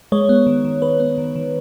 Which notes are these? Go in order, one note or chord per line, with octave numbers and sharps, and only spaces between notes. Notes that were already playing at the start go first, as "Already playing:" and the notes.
G#3 C#5
B3
D#3
D#3
G#3 B4
B3
D#3
D#3